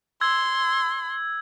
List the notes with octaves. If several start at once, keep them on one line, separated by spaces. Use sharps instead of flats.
C6 E6 G#6